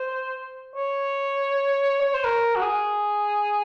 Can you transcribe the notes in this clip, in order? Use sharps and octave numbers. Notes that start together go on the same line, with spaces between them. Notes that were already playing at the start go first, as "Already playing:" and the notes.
Already playing: C5
C#5
C#5
C5
A#4
F#4
G#4